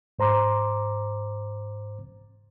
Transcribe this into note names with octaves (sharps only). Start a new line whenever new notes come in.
G#2 C5 A#5 C6 D6